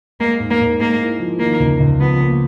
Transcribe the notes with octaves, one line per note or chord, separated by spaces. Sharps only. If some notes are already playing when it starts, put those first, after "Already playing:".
G#3 A#3
G#2
A#3
G#2
G#3 A#3
E4
F3
D#3 A#3
C#2
C#2
F3 B3
A#3